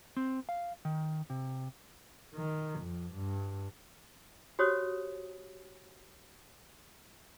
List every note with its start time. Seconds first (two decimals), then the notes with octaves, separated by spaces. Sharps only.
0.17 C4
0.49 F5
0.85 D#3
1.30 C3
2.35 D#3
2.80 F2
3.13 G2
4.59 F#4 G4 C5 C#5 D#6